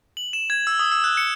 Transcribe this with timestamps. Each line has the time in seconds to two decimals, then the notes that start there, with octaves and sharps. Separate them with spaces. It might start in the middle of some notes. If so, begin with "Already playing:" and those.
0.17 F#7
0.33 E7
0.50 G#6
0.67 E6
0.79 D#6
0.92 E6
1.04 F#6
1.17 C#7